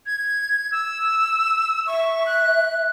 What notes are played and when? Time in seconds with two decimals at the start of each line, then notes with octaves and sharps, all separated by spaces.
0.06 G#6
0.72 E6
1.87 E5 C#6
2.26 F#6